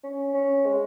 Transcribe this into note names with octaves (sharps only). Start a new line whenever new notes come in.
C#4
C#4
G#3